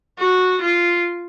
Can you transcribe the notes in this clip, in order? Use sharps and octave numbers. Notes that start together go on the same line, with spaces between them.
F#4
F4